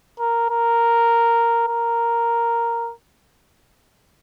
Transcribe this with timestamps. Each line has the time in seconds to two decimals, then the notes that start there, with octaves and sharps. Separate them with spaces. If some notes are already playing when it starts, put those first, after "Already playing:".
0.19 A#4
0.50 A#4
1.68 A#4